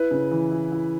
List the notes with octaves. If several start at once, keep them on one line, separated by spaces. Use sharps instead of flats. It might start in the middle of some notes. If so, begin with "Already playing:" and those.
Already playing: E4 B4
C#3
E3
E4
E4